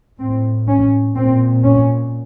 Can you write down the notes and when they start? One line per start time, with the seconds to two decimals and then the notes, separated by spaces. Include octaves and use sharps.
0.19 A2 C4
0.68 C#4
1.15 A#2 C4
1.64 C#4